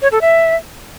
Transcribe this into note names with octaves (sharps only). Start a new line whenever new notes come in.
C#5
A4
E5